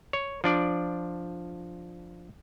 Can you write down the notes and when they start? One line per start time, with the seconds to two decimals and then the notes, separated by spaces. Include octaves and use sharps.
0.13 C#5
0.44 F3 D4 D5